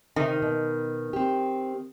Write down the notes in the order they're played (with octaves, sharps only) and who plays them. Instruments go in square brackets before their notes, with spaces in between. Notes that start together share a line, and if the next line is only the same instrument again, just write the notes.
[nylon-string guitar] C3 D#4 D#5 [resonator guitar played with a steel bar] D#3
[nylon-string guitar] B2
C4 G4